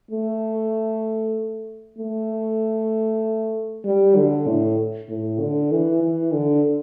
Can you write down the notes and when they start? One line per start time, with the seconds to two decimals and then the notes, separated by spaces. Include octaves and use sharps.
0.11 A3
1.98 A3
3.85 G3
4.16 D3
4.47 A2
5.09 A2
5.41 D3
5.72 E3
6.02 E3
6.33 D3